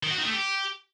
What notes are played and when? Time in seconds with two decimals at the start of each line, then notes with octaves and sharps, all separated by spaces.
0.03 D#3
0.10 F#4
0.18 D#3
0.25 A3
0.33 G4